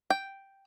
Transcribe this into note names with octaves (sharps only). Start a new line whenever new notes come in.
G5